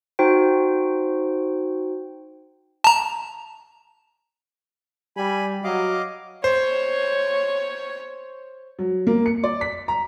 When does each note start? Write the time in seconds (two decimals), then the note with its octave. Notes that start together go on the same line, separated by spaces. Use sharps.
0.19 D#4 F#4 C5 G5
2.84 A5 A#5
5.17 G3 G#5 B5
5.64 F#3 D#5 F5 D6
6.44 C5 C#5
8.79 F#3
9.07 A#3
9.26 C#7
9.44 D5
9.61 B6
9.88 A#5